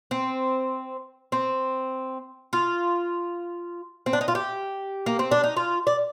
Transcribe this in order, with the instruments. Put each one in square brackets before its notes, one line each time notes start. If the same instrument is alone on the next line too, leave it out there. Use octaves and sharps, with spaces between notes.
[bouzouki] C4
C4
F4
C4
D4
D#4
F4
G4
A#3
C4
D4
D#4
F4
D5